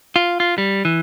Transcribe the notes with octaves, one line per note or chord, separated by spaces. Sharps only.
F4
F4
G3
E3